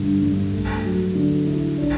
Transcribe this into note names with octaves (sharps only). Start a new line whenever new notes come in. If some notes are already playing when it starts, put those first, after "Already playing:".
Already playing: G2 D3 A3
G2
A3
F#3
D3
E4
D4